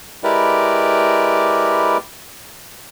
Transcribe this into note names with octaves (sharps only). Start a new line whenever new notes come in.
G#3 E4 G4 A#4 B4 D5